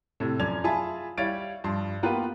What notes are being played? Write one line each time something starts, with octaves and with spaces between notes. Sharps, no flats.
A2 C3
F#2 F3 D5 G#6 F7
F4 G#4 E5 G#5 A5 B5
G3 E4 C#5 F5 A6 D7
G2 F3 C6
A#3 B3 F4 G4 A#4 B4